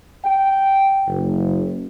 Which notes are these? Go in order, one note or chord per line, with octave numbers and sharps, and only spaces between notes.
G5
F#1